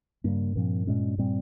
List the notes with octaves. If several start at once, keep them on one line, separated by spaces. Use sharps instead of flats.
G2 C#3 G3 A#3
A#2 F3 C4
A#2 G#3 C#4
A#2 G3 C4